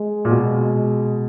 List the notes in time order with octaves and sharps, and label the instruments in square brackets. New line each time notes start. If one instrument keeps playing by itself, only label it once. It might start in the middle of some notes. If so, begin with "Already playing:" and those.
Already playing: [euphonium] G#3
[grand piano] A#2
B2